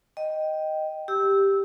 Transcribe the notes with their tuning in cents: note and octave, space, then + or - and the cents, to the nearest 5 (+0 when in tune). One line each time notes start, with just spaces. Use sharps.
D#5 +0 G5 -5
G4 +0 E6 -15